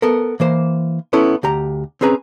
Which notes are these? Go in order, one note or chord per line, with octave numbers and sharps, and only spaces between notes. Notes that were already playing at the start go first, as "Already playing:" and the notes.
B3 A4 A#4
E3 A#3 C5
B3 C#4 E4 A4
D2 G4 A#5
C4 C#4 G#4 B4 A#5